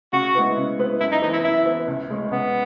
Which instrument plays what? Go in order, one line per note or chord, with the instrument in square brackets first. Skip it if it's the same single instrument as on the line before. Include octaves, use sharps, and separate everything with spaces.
[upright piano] C#3 [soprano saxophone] F#4
[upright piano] G#3 B3 E4 B4
C#3
G#3 B3 E4 B4
[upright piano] F#2 [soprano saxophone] E4
[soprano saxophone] D#4
[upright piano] E3 B3 [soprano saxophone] D#4
[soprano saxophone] E4
[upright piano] F#2 [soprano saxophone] E4
[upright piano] E3 B3
C#2
C#3 G#3 C#4
[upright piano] C#2 [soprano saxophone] B3